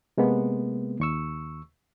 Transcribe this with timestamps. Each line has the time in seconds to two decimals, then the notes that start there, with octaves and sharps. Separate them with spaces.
0.18 C3 G#3 A#3 B3
1.00 D#2 C#6 E6